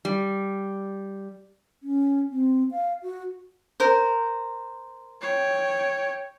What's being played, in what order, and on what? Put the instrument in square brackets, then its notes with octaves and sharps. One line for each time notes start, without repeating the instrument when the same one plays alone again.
[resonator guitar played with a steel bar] G3
[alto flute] C#4
C4
F5
F#4
[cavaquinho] A#4 C5
[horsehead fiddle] C#5 G5